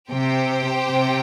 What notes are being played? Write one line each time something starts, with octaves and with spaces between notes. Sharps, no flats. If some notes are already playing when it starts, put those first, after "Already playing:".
C3 G4 C5 G5
C3